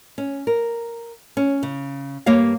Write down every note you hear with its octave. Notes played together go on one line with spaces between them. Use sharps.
C#4
A#4
C#4
C#3
G2 A#3 G4 C#5 F5